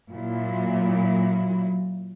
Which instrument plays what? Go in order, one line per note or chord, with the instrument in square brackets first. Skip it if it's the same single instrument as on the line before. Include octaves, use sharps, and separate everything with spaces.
[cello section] A#2 F#3 E4